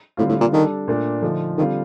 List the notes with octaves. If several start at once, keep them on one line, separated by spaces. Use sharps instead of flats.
A2 D3 G3 C4 F4
A2
A#2
D#3 G3 D4 A4
A#2 A3 D4 A4
D3 F3 A3 D#4
D3 D#3 G3 C4 F4